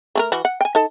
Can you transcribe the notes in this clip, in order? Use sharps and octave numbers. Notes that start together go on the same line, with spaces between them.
A3 G#4 A#4
E3 F#4
F#5
G5 G#5
D#4 A4 A5